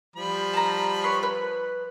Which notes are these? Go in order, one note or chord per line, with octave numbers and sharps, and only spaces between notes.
F3 G3 B5
A5 A#5
B4 C#5 C6
B4